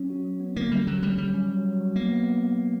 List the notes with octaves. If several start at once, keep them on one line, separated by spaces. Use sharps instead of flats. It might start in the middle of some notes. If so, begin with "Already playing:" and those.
Already playing: F#3 C#4
F#4
F#3
B3
D3 A#3
G3 C#4
F#3 C#4
F#3 G3
F#3 G3
C#4
F#3
F#3
F#3
A#3 B3
B3
B3
B3